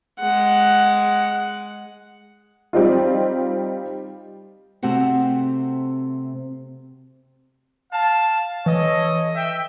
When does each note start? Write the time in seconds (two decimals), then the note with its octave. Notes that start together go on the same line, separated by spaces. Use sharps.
0.20 G#3 F#5
2.73 G3 C4 D#4 F4
4.83 C3 A3 C4 F#4 F#5
7.92 F5 A5
8.66 E3 A4 C#5 D#5
9.35 E5 G5